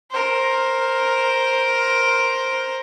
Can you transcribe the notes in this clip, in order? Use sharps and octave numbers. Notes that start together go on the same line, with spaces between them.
A#4 C5